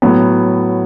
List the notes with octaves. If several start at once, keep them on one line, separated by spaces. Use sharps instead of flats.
A2 F#3 B3